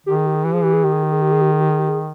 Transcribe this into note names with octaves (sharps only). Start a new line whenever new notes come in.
D#3 G4
G#4
G4
G#4
E3 G4
F3 G#4
E3 G4
G#4
D#3 G4
G#4
G4
G#4
G4
G#4
G4
G#4
G4
G#4
G4
G#4